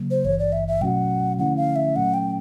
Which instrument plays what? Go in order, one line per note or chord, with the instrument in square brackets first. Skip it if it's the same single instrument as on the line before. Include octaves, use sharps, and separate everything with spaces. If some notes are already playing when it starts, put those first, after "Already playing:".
Already playing: [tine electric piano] C#3 F#3 A#3
[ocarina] C5
[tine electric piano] G#1 G2 E3 [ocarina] C#5
[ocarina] D5
E5
E5
[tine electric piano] B2 F#3 A3 C#4 F#4 [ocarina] F#5 G5
[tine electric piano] D3 F3 A3 C#4 E4 [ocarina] F#5
[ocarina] F5
E5
[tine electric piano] A#2 F#3 A3 C#4 [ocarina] F#5
[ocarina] G5